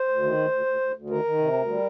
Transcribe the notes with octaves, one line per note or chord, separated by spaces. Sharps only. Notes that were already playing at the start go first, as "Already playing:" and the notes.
Already playing: C5
D2
D#3
D2
D2
D2
D2
D2
D#3 A#4
D#3
C3
D2
G3